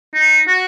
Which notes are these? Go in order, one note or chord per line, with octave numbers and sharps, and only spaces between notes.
D#4
F#4